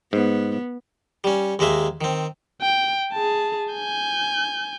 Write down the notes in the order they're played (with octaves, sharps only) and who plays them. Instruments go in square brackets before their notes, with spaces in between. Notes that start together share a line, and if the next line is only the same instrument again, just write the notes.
[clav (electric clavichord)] G#2 [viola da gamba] B3
[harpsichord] G3 C#4
D#2 G#3 A#3 E5 C6
D#3 C4
[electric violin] G5
G#4 A5
G#5 G6